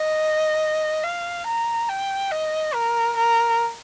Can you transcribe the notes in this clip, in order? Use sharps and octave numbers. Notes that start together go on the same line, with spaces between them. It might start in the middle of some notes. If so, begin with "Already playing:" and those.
Already playing: D#5
F5
A#5
G5
D#5
A#4
A#4